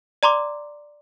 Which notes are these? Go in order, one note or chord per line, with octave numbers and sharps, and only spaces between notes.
D5 A#5 C6 D6